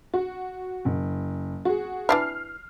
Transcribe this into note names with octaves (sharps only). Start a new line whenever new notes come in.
F#4
F#1
F#4 G#4
E3 D4 E4 F6 C7